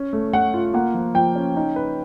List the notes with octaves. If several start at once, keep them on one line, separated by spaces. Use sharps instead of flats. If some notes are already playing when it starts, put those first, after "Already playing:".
Already playing: C#4
A3
A3 F#5
F4
A#3 F#5
F3
F3 G5
C#4
D#4
B4